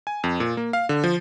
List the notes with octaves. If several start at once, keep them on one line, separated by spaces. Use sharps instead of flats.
G#5
F2
A#2
A#3
F5
D3
F3